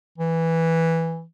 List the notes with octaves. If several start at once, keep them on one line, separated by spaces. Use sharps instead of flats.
E3